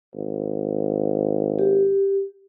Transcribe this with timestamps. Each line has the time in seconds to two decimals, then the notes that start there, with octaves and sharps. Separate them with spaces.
0.15 G#1
1.59 G4